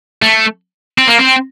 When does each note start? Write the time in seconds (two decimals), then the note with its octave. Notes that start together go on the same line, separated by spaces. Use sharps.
0.22 A3
0.98 C4
1.07 A#3
1.18 C4